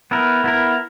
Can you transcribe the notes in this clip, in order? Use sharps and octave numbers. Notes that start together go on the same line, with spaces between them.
B3 E4 A#4
B3 E4 A#4